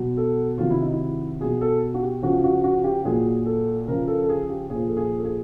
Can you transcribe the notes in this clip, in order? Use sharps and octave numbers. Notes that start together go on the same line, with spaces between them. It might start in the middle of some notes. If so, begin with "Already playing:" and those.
Already playing: B2 F#3
A4
C3 D#3 F#3 F4
E4
D#4
E4
B2 F#3 G#4
A4
F#4
G4
C#3 F3 F#4
F#4
F#4
G4
A#2 F#3 G#4
A4
C#3 F3 A#4
A4
A4
G#4
G4
A#2 F3 G#4
A4
G#4
A4
G#4